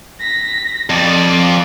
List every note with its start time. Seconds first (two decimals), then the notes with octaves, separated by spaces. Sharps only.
0.20 A#6 B6
0.90 F2 D5